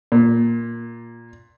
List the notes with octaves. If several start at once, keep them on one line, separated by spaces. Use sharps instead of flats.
A#2